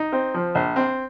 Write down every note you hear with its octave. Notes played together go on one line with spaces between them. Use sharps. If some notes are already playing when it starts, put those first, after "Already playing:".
Already playing: D#4
C4
F3
A#1
C4